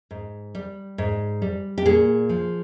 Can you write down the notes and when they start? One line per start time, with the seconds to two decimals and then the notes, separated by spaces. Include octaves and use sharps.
0.11 G#2
0.55 G3
0.98 G#2
1.42 G3
1.78 G4
1.85 A#2 G#4
2.29 F3